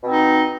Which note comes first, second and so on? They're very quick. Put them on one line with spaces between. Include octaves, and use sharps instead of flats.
B2 C4 D#4